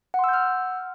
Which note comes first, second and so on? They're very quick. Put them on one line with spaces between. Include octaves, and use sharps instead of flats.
F#5 C6 E6 G6 F6